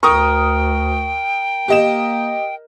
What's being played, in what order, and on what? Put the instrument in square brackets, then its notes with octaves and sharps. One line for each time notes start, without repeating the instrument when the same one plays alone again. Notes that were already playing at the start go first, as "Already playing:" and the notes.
[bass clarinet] D2 [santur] A#4 [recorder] G5 [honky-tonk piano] C#6 D#6
[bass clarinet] A#3 [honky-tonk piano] G4 D#5 E7